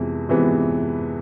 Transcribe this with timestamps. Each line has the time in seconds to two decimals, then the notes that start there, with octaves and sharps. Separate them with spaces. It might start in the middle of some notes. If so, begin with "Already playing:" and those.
Already playing: F2 C3 E3 G#3 B3
0.29 F2 C3 E3 G#3 B3